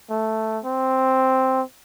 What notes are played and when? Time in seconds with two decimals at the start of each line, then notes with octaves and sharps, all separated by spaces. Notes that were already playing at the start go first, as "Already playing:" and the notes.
0.10 A3
0.64 C4